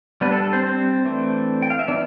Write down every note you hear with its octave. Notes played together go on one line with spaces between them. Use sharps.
G3 B3 D4 B4
A4
A4
C4 C5
C4 C5
E3 A3 D4
G5
F5
E5
E3 B3 D4 D5